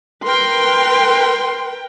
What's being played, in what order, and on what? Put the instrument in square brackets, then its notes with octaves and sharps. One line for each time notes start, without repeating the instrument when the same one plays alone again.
[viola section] A#4 B4 G5 [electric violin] C6